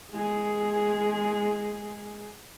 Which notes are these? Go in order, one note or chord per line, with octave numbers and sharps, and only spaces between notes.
G#3 G#4